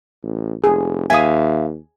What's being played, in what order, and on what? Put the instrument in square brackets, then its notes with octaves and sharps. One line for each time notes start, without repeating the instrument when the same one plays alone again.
[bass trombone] A1
[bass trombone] F1 [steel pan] G#4
[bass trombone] D#2 [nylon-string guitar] E5 F5 [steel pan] G#5 D#6